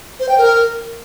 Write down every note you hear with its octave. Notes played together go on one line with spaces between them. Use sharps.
C5
G5
A#4